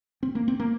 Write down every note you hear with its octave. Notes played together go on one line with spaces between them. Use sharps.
C4
A#3
C4
A#3